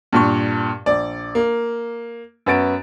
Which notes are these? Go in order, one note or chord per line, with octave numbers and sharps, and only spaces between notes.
G2 A#2 C#6
A#1 D5
A#3
F#2 B3 F#4 A6 D7